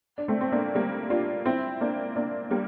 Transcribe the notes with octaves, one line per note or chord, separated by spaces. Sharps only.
D4
A3 C4
C4
A#3 D4
G3 A#3
D4 F4
C4 E4
A#3 D4
A#3 D4
G3 A#3